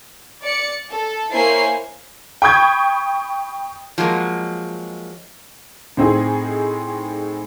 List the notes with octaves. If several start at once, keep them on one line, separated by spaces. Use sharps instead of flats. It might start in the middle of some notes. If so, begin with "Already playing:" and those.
D5 C#7
A4
A#3 E4 C5 C#5 G#5 C7
G5 B5 C#6 D#6 G6 G#6
F3 F#3 G#3 A#3
A2 C4 D#4 G#4